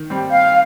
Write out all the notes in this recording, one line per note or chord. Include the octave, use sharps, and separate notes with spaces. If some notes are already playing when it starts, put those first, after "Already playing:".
Already playing: D#3
G3 C4
F5